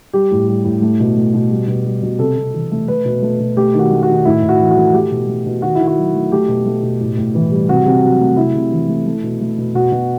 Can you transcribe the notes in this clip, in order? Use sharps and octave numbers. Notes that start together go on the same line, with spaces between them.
G3 G4
A2
G3
A2
A3
B2
A3
B2
G3
B2
G3
B2
C3 A4
C3
E3
A3
A3 B4
B2
A3
B2
A3 G4
D#3 F#4
A3
F#4
D#3
A2 E4
A2
F#4
E3
F#4
A3
A3 G4
B2
A3
B2
D#3 F#4
D#3 E4
F#4
F#3
A3
A3 G4
B2
A3
B2
A2
A2
E3
G3
C3 F#4
C3
F#3
A3
C3 E4
C3
E3
A3
A3
B2
A3
B2
B2 F#4
B2